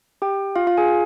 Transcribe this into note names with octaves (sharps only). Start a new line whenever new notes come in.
G4 G5
F4 F5
F4 F5
G#4 G#5